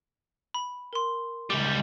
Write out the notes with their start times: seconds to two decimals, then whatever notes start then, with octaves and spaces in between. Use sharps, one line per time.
0.54 B5
0.93 A#4 C6
1.50 C#2 G3 D6